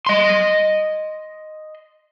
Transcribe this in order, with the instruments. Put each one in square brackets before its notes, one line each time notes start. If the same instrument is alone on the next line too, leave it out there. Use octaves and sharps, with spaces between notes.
[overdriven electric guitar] D#5 C6